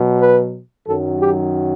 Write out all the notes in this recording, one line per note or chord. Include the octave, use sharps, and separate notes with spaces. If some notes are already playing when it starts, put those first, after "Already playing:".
Already playing: B2 F#3
B4
F#2 D#3 F#3 A4
G4